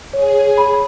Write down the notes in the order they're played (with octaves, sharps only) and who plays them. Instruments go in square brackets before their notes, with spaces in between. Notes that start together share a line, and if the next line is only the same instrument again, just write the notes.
[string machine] G#4 [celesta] C#5
[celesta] B5